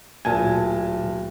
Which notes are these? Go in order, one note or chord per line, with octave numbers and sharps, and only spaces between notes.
D1 A#2 G#5 A5